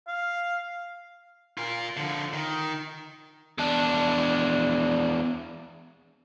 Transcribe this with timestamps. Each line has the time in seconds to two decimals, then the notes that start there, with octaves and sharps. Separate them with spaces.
0.07 F5
1.58 F4 A#4
1.97 D3 F3
2.33 D#3
3.59 E2 D4